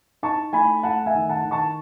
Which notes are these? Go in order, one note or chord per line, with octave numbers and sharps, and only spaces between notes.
D#4 A5 C#6
A3 G#5 B5
A3 F#5 A5
E5 G#5
D#3
F#5 A5
D#3
A5 C#6